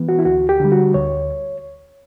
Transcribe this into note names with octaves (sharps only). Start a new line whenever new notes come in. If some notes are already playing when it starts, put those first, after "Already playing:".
Already playing: E3 B3
F#4
E4
D2 F#4
G4
D3 G3
F#4
D2 C#5